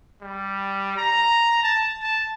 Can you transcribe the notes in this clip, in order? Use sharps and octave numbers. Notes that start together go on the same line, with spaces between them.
G3
A#5
A5
A5